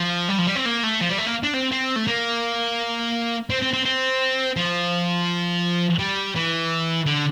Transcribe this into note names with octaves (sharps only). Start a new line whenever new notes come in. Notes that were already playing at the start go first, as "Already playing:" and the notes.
Already playing: F3
G3
F3
G3
C4
A#3
A3
F3
G3
A3
A#3
D4
C4
C4
A3
A#3
C4
C4
C4
C4
F3
G3
E3
D3